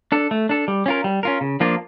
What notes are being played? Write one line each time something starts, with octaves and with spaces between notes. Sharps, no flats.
D4 A4
A3
D4 A4
G3
C#4 F4 A#4
G3
C#4 F4 A#4
C#3
F3 A#3 D4 F4